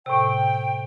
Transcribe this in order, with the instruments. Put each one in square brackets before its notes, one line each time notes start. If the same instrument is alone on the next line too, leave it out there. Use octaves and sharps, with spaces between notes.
[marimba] A2 C3 [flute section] G5